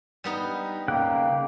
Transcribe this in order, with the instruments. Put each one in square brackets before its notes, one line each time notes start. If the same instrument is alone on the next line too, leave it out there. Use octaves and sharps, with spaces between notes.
[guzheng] G3 B3 D#4
[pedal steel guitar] C#3 G5 F#6 [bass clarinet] A#3